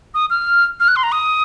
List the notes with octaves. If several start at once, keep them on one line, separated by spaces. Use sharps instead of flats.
D#6
F6
F6
F#6
C6
A#5
D#6